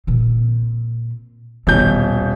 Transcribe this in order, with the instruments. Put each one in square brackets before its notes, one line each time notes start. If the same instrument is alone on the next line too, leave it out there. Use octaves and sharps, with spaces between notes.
[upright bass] A#2 C4
[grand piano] D#1 B2 G6 [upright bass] D#3 E4